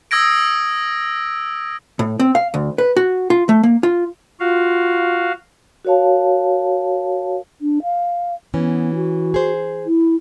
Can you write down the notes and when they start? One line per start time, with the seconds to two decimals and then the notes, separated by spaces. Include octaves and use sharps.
0.11 D#6 E6 G#6 A#6 D7
1.99 A2
2.20 C4
2.35 F5
2.54 D2
2.78 B4
2.97 F#4
3.30 F4
3.49 A3
3.63 A#3
3.83 F4
4.40 F4 F#4 F5
5.85 F#4 A#4 C#5 F5 A5
7.61 D4
7.82 F5
8.54 E3 B3 C#4
8.95 F#4
9.34 G#4 C5
9.86 E4